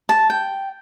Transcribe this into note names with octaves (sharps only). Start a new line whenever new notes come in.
A5
G5